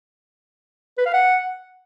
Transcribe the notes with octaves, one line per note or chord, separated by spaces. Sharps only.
B4
F5
F#5